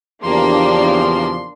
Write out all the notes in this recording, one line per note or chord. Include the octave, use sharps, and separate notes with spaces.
E2 C#3 F3 A#3 D4 G4 C6